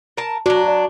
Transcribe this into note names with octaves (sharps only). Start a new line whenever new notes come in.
A#4 A5
F#3 D4 F#4
D5